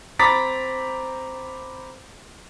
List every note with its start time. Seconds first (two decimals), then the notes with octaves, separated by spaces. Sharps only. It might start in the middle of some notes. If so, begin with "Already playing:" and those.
0.19 C4 A#5 B5 D6 A6 B6